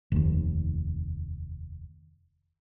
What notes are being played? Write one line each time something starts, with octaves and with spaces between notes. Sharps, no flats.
F1 D#2